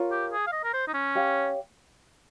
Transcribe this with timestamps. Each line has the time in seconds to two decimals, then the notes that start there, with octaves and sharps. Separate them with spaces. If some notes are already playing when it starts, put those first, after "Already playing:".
Already playing: F4 A#4 C#5
0.12 G4
0.32 G#4
0.47 F5
0.52 D#5
0.64 A#4
0.74 C5
0.88 D#4
0.94 C#4
1.15 G4 C#5 F5